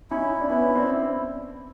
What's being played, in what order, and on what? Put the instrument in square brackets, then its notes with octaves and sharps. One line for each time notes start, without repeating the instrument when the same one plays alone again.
[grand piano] C#4 D#4 [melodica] E4
[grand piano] D4
[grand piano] B3 C#4 [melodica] E4
[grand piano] C4 D4